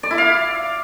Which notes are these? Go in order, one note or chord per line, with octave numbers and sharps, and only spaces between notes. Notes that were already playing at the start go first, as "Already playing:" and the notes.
D5
E4
F5